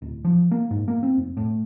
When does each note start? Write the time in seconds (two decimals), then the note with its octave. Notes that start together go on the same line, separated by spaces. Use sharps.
0.02 D1
0.25 F3
0.51 A#3
0.71 G#2
0.88 A#3
1.03 C4
1.18 F1
1.37 A2